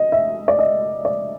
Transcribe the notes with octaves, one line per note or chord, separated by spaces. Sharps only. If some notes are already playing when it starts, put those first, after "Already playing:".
Already playing: D#5
E5
D5
D#5
D5